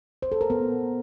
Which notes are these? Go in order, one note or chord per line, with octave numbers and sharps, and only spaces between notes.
C5
A4
A#4
B3